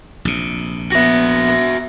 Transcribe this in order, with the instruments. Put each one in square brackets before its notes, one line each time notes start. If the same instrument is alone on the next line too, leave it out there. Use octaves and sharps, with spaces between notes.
[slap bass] A#1 C3
[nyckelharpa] B3 [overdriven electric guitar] F#4 E5 [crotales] A#6